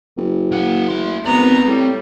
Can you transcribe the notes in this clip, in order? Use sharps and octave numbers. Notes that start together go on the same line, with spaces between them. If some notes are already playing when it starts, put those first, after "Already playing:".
F#1
A#3 F#5
A3 C6
G#1 B3 C4 D5 A#5
A2 G3